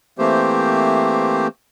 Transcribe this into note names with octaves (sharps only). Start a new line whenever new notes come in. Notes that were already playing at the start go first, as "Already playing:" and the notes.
E3 A3 A#3 C4 G4 C5